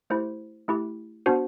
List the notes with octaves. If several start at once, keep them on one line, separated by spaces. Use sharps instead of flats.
A3 E4 G4 C5
A3 E4 G4
B3 D4 F#4 C5